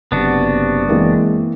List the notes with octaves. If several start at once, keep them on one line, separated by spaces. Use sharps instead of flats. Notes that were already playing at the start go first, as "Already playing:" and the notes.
F#1 C3 B3 D4 F#4
E3 G#3 A#3 C4